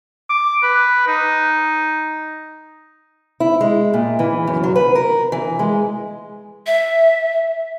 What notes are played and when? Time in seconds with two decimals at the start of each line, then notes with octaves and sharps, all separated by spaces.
0.29 D6
0.63 B4
1.08 D#4
3.40 E4
3.61 G#3
3.94 A#2
4.19 E3
4.47 F#2
4.64 F#3
4.76 B4
4.95 A#4
5.32 E3
5.59 G#3
6.67 E5